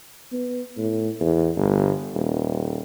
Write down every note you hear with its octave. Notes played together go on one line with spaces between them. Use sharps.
B3
A2
E2
G1
D#1